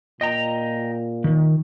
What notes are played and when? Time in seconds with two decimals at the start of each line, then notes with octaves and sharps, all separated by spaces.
0.21 A#2 D#5 G5 A#5
1.24 D#3